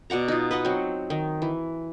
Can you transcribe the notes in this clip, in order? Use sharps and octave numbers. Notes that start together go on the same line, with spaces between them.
B2 D5 F#5 A#5
D#4 F4
B4 D#5 F#5
F#3 C4
D#3
E3